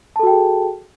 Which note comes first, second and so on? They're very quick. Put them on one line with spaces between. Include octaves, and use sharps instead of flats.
A5 A4 F#4 G5 G#4